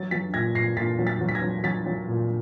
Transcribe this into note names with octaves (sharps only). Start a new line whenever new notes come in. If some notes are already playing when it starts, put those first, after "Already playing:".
Already playing: F#3 A6
F#3 A6 B6
A#2 G#6 A#6
A#2 A#6 C7
A#2 A6 B6
F#3
A6 B6
F#3
B6
G#6 A#6
F#3
F#3 A6 B6
F#3
A#2